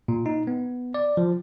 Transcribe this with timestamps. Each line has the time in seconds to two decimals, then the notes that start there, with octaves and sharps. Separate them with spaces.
0.08 A#2
0.26 D#4
0.47 B3
0.94 D5
1.17 F3